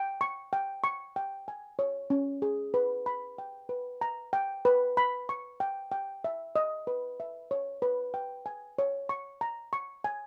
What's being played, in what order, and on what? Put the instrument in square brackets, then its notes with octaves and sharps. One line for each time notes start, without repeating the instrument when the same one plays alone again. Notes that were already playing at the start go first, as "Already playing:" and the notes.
Already playing: [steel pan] G5
C#6
G5
C#6
G5
G#5
C#5
C#4
G#4
B4
B5
G5
B4
A#5
G5
B4
B5
C#6
G5
G5
E5
D#5
B4
E5
C#5
B4
G5
G#5
C#5
C#6
A#5
C#6
G#5